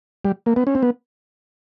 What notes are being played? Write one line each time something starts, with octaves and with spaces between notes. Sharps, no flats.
G3
A#3
B3
C#4
C4
B3